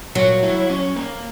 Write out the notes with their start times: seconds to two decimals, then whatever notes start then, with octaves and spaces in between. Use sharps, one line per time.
0.15 A#2 F#3
0.43 E4
0.70 C#4
0.96 A#3